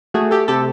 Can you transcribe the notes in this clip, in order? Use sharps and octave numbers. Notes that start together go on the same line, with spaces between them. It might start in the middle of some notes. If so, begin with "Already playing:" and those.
A3 F#4 G#4
G4 A4
C3 G4 A4